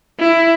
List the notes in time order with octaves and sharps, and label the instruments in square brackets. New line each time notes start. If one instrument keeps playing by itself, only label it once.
[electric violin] E4